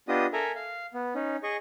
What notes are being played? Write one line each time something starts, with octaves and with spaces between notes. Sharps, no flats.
B3 D4 F4 G4 D#5 D#6
A4 A#4 E5 G#5 A#5
F5
B3
C#4 D#4
G#4 D#5 C#6